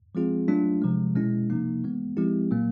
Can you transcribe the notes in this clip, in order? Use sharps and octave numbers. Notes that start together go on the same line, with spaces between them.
F3 G#3 C4 F4 G#4
F#3 A3 D4 F4
C3 F3 G#3
B2 G#3 C#4 E4
C3 F3 A#3 D#4
E3 G#3 B3
F3 G#3 C4 E4 G4
A#2 F#3 A#3